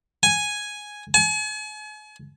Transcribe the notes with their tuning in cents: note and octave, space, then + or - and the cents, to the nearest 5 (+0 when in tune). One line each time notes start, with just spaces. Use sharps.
G#5 +0
G#5 +40